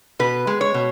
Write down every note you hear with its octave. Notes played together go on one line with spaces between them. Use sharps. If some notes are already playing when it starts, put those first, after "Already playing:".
B2 B4
G#3
C#5
B2